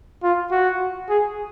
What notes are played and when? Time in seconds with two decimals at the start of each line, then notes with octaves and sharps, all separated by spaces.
0.23 F4
0.51 F#4
1.09 G#4